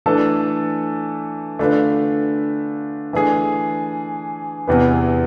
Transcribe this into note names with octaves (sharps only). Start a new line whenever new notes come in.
E3 A3 D4 A4
D3 A3 D4 F4 B4
E3 A3 D4 G#4
E2 C3 E3 B3